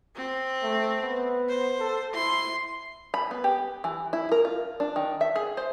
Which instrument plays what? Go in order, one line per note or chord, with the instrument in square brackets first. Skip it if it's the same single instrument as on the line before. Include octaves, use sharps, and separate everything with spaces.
[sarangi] C4
[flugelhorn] A3
B3
[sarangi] C5
[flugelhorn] A4
[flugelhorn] E4 [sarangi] C6
[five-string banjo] B5
B3
G4
E3
E4
A#4
F4
D4
D#3
E5
G#4
C5